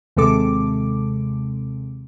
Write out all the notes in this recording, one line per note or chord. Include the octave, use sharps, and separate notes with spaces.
D#2 C3 G#3 A4 D6